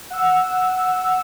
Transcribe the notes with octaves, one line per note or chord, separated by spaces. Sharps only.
F#5 E6